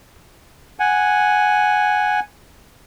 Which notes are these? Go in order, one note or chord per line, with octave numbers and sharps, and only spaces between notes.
F#5 G#5